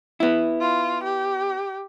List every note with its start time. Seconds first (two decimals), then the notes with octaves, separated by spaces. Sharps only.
0.20 B3 E4
0.61 F4
1.04 G4